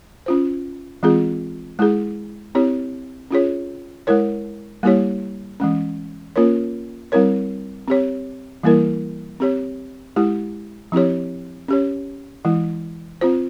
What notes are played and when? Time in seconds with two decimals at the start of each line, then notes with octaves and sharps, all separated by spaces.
0.26 C#4 F4 C5
1.03 E3 G#3 C4 F4 G#4
1.79 G#3 E4 G#4
2.55 C4 E4 G4 C#5
3.31 C#4 F4 G#4 C#5
4.07 G#3 E4 A#4 C#5
4.83 G3 A#3 E4 G4 C#5
5.60 E3 G#3 C#4
6.36 A#3 C#4 F4 A#4 C#5
7.12 G3 C4 E4 A#4 C#5
7.88 C4 G4 C#5
8.63 E3 G3 A#3 E4 A#4
9.40 C4 G4 C#5
10.16 G#3 E4 G4
10.92 F3 C4 E4 G4 C#5
11.68 C#4 G4 C#5
12.45 E3 G#3 E4
13.21 C4 F4 C5